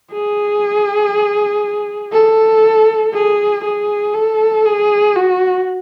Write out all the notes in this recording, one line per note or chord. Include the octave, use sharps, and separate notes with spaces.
G#4
A4
G#4
G#4
A4
G#4
F#4